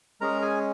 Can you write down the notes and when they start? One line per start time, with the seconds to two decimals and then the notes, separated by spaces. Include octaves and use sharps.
0.21 G#3 C#4 G#4 A#4 A#5
0.42 G#4 G#5